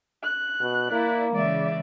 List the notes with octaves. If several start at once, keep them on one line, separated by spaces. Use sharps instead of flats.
F#6
B2
A#3 E4 D5
C#3 E3 G#3 D5 E5